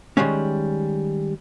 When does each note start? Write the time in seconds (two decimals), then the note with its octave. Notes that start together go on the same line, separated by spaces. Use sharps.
0.17 D#3 F3 G3 G#3 C#4